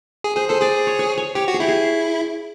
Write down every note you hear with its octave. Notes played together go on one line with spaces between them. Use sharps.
G#4
G#4 C5
A4 C5
G#4 D5
C#5
C#5
C#5
G4 C#5
F#4
G#4
E4 G4
G#4